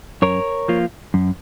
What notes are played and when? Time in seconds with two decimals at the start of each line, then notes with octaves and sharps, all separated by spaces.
0.22 F#2 A#4 C#5
0.68 F3 A#3 F4
1.14 F#2